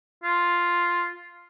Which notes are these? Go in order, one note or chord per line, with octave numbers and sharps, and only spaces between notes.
F4